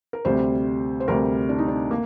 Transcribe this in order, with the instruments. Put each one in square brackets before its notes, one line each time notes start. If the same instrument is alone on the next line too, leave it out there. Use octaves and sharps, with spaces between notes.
[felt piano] A#4
D2 C3 G3 C5
C5
D2 C3 G3 A#4
D4
D#4
D4
A#3